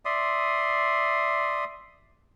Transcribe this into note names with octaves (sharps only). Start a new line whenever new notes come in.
D5 E5 C6 D#6